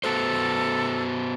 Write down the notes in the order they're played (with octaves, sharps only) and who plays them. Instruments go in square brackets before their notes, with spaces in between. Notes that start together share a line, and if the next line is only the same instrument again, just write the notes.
[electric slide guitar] B3 F#4 C5 [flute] A4